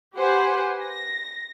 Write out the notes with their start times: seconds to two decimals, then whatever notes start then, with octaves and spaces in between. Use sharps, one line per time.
0.15 G4 B4 C5 F#5 G#5
0.81 A#6